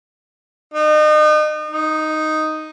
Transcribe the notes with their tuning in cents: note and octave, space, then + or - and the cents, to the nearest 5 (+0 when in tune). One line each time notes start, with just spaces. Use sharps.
D#4 -35
D#4 +0